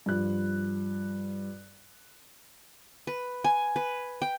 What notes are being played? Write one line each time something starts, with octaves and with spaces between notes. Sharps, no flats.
G2 F3 F#6
B4
G#5
B4
G5